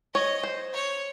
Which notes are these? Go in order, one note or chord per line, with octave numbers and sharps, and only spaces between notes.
C#5 D#5
C5
C#5